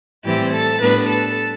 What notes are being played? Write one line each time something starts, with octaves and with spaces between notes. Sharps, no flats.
A2 E3 G3 C4 E4 G4
A4
A2 G3 B3 D4 B4
A4